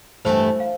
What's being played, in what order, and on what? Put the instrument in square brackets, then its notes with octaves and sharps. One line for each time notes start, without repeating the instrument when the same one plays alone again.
[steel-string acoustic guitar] G2 E3 A3 E4 A4 [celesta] C5
[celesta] F5